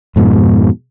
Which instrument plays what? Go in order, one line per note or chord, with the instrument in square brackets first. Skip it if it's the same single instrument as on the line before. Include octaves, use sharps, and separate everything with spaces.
[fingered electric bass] F2 G#2 B2